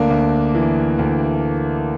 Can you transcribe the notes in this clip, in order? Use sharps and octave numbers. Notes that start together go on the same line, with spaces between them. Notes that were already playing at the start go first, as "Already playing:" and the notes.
Already playing: D2 A#3 D4
D2
E3
D2